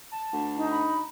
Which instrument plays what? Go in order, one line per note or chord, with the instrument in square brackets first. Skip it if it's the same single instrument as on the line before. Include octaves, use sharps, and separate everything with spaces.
[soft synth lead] A5
[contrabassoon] D2
[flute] D#4
[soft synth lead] B5